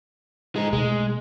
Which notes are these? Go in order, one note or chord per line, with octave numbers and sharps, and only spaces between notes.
G#3 D#4
B2 G#3 A3